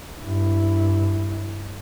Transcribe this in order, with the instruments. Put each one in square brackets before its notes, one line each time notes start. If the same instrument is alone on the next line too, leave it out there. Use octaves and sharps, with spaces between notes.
[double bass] G2 E4